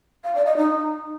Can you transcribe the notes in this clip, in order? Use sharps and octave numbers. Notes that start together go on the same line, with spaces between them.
F5
D5
D#5
D#4